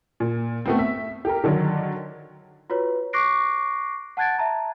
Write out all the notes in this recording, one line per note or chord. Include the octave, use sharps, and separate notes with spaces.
A#2
A3 B3 C4
E5
G4 A4 A#4
D3 D#3 F#3 D4
F4 F#4 B4 C#5
C#6 D6 F#6 A#6 C7 D7
F#5 A5 F#6 G#6 A6 D7
E5 A5 A#5